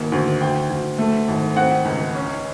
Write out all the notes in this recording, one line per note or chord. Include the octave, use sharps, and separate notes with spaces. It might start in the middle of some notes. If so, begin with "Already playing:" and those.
Already playing: G#1 A#3
D2
D2 G5
D2
A3
G#1
C4 F#5
C#2
C#4